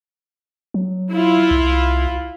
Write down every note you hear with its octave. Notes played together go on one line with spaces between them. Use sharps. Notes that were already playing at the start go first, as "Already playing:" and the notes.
F#3
E4 F4
C2